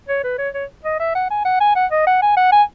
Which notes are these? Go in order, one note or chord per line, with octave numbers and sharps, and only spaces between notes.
C#5
B4
C#5
C#5
D#5
E5
F#5
G#5
F#5
G#5
F#5
D#5
F#5
G#5
F#5
G#5